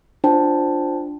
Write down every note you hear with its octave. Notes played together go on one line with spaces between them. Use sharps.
D4 F4 C5 G5 A5